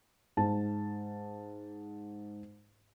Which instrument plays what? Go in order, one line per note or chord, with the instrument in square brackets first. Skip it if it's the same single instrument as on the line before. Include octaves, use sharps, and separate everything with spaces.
[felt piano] G#2 A5